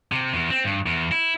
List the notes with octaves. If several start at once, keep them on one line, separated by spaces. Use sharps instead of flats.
C3
E2
C4
G2
E2
E4